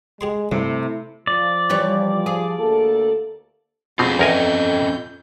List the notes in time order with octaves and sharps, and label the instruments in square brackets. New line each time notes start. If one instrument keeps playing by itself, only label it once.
[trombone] G#3 [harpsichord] G4 G#4 C6
[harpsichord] G2 [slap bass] C3 [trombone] A3 [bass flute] E4
[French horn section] F3 [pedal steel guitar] D5
[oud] E3 G3 C#5
G#4
[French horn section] D2 A#3 A4
[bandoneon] F2 G6 [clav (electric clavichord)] B2 C4 [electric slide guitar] F4 G#4
[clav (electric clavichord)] E2 A#4 G#5 [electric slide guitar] C#4 A4 D#5